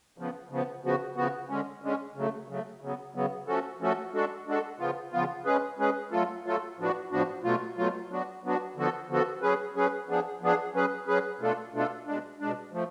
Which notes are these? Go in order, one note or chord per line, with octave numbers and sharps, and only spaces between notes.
C#3 F3 B3
C#3 F3 B3
C#3 F3 B3 F#4
C#3 F3 B3 F#4
D3 G#3 C#4
D3 G#3 C#4
C#3 F#3 A3
C#3 F#3 A3
C#3 F#3 B3
C#3 F#3 B3
F3 A3 C#4 F#4 A4
F3 A3 C#4 F#4 A4
G#3 D4 F#4 A4
G#3 D4 F#4 A4
C#3 F3 B3 F4
C#3 F3 B3 F4
G#3 C#4 G#4 B4
G#3 C#4 G#4 B4
F#3 A3 F4 A4
F#3 A3 F4 A4
A2 F3 B3 D4 F#4
A2 F3 B3 D4 F#4
B2 F#3 A3 F4
B2 F#3 A3 F4
F#3 B3 D4 F#4
F#3 B3 D4 F#4
D3 F3 B3 F#4 A4
D3 F3 B3 F#4 A4
F#3 C#4 G#4 B4
F#3 C#4 G#4 B4
F3 B3 D4 G#4
F3 B3 D4 G#4
F#3 C#4 G#4 B4
F#3 C#4 G#4 B4
B2 A3 D4 F4 A4
B2 A3 D4 F4 A4
B2 G#3 D4
B2 G#3 D4
F3 A3